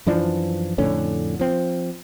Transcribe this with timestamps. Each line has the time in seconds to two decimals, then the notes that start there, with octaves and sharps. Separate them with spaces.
0.06 F#2 E3 F3 D4
0.78 F2 A2 D3 C#4
1.39 F3 C4